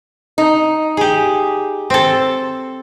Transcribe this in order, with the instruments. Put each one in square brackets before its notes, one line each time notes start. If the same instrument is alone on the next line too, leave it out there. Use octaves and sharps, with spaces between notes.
[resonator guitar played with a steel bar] D#4
[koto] G4 G#4
C4 A4